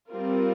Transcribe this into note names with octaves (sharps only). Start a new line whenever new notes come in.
G3 C4 F4 A#4